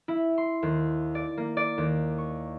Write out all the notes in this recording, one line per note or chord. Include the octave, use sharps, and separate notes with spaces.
E4
C6
D#2
D5
A#3
D5
D#2
C#6